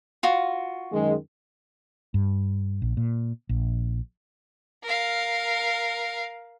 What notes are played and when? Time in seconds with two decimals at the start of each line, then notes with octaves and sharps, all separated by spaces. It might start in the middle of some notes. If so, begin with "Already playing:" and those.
0.23 F4 F#4
0.92 F#2 D#3 G#3
2.14 G2
2.82 A#1
2.97 A#2
3.49 A#1
4.83 A#4 F5